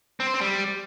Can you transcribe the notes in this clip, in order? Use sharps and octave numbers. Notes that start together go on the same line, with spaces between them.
C4
C5
C4
G3